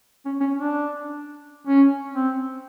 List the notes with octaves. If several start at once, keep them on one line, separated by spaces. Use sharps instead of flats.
C#4
C#4
D4
C#4
C4